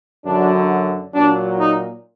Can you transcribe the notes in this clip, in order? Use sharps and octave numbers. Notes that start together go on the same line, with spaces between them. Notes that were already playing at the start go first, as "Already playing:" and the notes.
F#2 D3 F#3 D4
A#2 F#3 D4
D#4